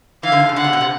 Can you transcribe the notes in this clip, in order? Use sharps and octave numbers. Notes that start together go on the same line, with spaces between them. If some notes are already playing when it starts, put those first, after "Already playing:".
E3 F5
D3
C3
C#3
D3 F#5
C3
B2
C3